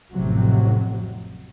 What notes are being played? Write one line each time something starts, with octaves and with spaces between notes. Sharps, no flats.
A1 F2 A2 C3 F#3